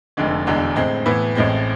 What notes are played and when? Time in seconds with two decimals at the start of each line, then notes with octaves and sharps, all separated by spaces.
0.17 F1 F2 D3 G#3
0.47 E1 E2 D3 G#3
0.76 A2 G#3 C4
1.06 A2 E3 B3 E4
1.35 A1 A2 G#3 C4